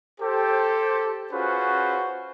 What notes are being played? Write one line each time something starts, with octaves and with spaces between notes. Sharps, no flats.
G4 A4 C5
C#4 F4 F#4 G#4 B4 C5